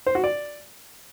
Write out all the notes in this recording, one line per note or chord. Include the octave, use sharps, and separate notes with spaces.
C5
F#4
D5